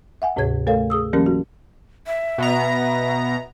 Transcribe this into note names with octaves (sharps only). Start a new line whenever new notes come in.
E5 F#5 G#5
D2 G#2 C3 G#4 C#5 G#6
A3 A4 A#4 C#5 F5
G#4 D#6 E6
E3 F#3 A#3 C#4 G4 A#4
F#4
E5
B2 B3 A#5